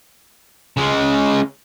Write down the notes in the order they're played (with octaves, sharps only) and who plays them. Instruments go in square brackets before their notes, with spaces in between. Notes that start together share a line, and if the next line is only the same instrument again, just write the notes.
[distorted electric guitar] C#3 G#3